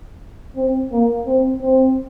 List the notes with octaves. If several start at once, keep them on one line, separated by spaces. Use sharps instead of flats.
C4
A#3
C4
C4